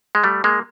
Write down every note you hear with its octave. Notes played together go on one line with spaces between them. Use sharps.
G#3
G3 A3
G#3 A#3